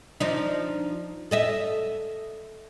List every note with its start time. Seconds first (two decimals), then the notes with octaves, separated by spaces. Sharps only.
0.20 F3 D4 D#4
1.31 A4 D#5 E5